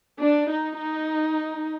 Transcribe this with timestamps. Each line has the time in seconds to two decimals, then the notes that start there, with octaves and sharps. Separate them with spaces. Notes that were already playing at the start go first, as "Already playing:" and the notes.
0.21 D4
0.51 D#4
0.79 D#4